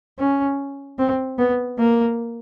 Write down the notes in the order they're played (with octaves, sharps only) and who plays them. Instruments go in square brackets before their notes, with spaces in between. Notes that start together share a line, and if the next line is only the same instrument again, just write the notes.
[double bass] C#4
C4
B3
A#3